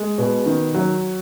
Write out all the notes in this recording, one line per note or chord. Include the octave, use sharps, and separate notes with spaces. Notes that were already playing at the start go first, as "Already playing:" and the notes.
Already playing: G#3
B2
D#3
F#3